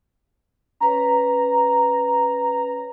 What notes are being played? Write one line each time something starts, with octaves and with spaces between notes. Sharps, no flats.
C#4 B4 C#5 A#5